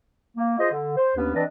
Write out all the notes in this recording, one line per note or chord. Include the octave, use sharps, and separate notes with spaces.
A#3
F4 G#4 C5 D#5
D3
C5
D#2 B3 C#4 D4 B4
E3 C4 D4 B4 D5 D#5